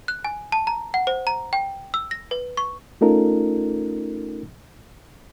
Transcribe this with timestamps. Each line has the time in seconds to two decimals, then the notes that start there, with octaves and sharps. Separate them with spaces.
0.08 F#6
0.24 G#5
0.52 A5
0.67 A#5
0.94 F#5
1.07 C5
1.27 A#5
1.53 G5
1.94 E6
2.11 A#6
2.31 B4
2.57 C#6
3.01 A3 C#4 D#4 F4 A4 A#4